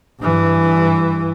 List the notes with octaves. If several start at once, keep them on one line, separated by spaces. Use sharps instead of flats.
G2 E3